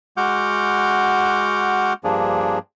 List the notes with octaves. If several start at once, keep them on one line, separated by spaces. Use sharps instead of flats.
G#3 F#4 F#5 D6 F6 G6
G2 F3 A#3 D4 G#4